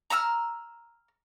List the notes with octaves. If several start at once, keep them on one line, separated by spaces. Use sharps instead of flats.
A#5 B5 E6 F6